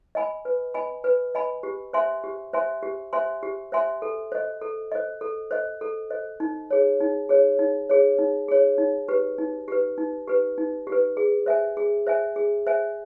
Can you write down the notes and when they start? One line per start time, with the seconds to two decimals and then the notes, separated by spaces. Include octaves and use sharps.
0.15 D#5 G#5 B5
0.45 B4
0.74 D#5 G#5 B5
1.04 B4
1.35 D#5 G#5 B5
1.63 G4
1.93 C5 E5 G#5 C6
2.24 G4
2.53 C5 E5 G#5 C6
2.83 G4
3.13 C5 E5 G#5 C6
3.43 G4
3.72 C5 E5 G#5 C6
4.02 A4
4.32 C5 D#5
4.61 A4
4.92 C5 D#5
5.21 A4
5.51 C5 D#5
5.81 A4
6.10 C5 D#5
6.40 D#4
6.71 G#4 C#5
7.01 D#4
7.29 G#4 C#5
7.59 D#4
7.89 G#4 C#5
8.19 D#4
8.48 G#4 C#5
8.78 D#4
9.08 G4 B4
9.38 D#4
9.68 G4 B4
9.98 D#4
10.28 G4 B4
10.58 D#4
10.87 G4
10.92 B4
11.17 G#4
11.46 C5 E5 G#5
11.77 G#4
12.07 C5 E5 G#5
12.36 G#4
12.66 C5 E5 G#5